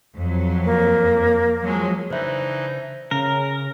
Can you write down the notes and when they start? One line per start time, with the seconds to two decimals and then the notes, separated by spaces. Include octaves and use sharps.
0.17 F2 F#3
0.65 A#3
1.63 F3 F#3 G#3
2.10 C#3 E3 D4 D#4 B4 C5 E5
3.11 C#3 A#4